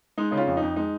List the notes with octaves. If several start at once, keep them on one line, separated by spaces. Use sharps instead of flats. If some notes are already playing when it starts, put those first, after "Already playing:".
G#3 D#4
C#3 D#4
C#4 F4
F2
D#4
F2
G#3 D#4